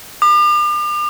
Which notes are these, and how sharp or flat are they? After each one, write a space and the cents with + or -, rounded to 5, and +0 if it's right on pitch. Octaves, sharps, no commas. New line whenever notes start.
D6 +40